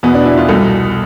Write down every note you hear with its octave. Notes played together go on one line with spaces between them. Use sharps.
E2 B2 B3
D4
E4
F4
C2 B2 A4